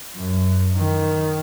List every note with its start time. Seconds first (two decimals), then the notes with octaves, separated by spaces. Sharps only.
0.16 F#2
0.76 D#3